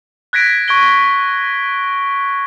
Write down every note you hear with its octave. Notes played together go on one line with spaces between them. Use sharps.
F#6 G#6 A#6 B6 D7
C#6 G#6 D7 G7